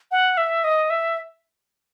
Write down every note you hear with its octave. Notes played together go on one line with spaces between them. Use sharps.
F#5
E5
D#5
E5